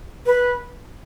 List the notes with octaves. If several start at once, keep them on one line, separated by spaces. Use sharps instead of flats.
B4